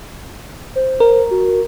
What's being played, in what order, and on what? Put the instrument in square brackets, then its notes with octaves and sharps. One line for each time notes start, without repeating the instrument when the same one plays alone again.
[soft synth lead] C5
[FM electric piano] A#4
[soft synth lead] F#4